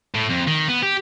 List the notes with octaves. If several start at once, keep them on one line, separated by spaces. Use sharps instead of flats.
A2
F2
D#3
B3
G4